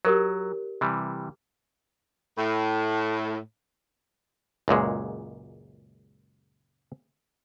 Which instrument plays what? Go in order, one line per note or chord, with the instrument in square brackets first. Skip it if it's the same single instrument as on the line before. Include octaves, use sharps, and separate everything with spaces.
[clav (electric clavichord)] F#3 [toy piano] G4 A#4 C#5
[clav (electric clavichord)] C3 E3 G3
[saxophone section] A2
[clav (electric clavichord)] C#2 F#2 A#2 G#3